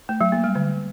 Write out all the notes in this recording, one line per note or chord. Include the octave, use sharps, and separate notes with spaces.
A3
F#3
A#3
G3
D3